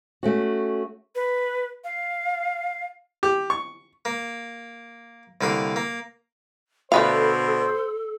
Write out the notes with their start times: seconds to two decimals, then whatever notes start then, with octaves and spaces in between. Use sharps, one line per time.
0.23 A3 C#4 F#4
1.15 B4
1.84 F5
3.23 G4
3.50 C#6
4.05 A#3
5.41 C2 D3 A#3 F5
5.76 A#3
6.92 B2 D3 A3 A4 B4 C5 F5